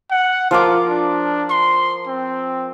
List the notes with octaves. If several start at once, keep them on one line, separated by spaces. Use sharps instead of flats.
F#5
F3 F4 A#4 D6
D4
C6
C4